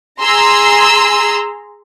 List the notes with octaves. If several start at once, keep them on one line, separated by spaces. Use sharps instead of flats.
G#4 A#5 C6 E6